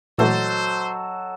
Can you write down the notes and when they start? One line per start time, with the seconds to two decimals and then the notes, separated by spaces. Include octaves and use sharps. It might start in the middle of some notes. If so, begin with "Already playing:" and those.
0.18 A#2 E3 F#3 A3 A4 C5 D#5